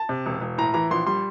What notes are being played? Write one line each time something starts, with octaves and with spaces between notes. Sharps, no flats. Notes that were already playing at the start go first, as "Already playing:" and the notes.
Already playing: A5
C3
E1
E1
A2 A#5
E3 A#5
A#1 C6
G3 C6